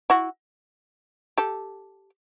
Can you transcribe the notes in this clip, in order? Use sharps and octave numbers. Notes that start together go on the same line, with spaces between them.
E4 F#4
G4 A4